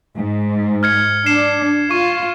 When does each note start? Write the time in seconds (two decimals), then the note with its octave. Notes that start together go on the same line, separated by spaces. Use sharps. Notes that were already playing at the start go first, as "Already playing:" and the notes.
0.15 G#2
0.83 F6 G#6 C#7
1.26 D4 C7 E7
1.91 F4 C#6